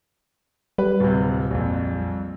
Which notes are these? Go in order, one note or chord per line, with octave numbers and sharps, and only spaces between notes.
G3 B4
D1 C3
A#1 F2